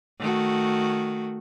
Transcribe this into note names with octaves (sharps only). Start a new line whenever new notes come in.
D#3 A3 F#4